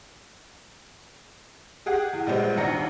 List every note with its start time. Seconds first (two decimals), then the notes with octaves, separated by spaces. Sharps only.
1.86 G4 G#4 F#5
2.13 E2
2.26 A#1 G3 G#3 B3 C5
2.57 G#1 D#2 D4 A#5 A#6 C#7